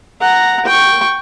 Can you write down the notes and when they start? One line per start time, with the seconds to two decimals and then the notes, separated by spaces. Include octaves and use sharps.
0.21 F#5 A#5
0.66 G5 C#6